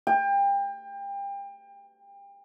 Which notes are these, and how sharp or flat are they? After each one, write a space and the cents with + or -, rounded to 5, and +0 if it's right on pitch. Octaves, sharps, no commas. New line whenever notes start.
G5 +30